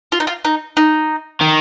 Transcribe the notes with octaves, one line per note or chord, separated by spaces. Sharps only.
F4
D#4
F4
D#4
D#4
D#3